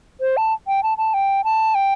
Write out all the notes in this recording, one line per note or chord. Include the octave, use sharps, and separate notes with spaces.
C5
A5
G5
A5
A5
G5
A5
G5